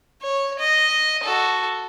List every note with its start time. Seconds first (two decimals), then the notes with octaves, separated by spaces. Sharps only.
0.22 C#5
0.59 D#5
1.24 F#4 A4